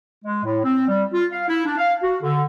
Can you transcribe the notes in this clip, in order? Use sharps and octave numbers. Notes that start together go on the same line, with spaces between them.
G#3
A2
C4
G3
F4
F5
E4
D4
F5
F#4
D3